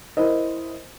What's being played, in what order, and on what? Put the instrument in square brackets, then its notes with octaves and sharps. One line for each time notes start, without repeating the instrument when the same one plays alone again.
[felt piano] E4 A#4 C5 D#5